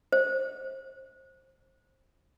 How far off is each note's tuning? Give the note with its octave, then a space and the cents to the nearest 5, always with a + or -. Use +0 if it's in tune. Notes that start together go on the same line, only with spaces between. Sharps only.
C5 +20